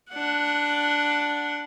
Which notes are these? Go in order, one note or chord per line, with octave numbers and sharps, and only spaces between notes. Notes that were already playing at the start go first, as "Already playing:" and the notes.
D4 F#5